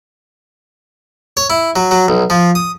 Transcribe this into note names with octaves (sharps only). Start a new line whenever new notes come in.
C#5
E4
F#3
F#3
B1
F3
D#6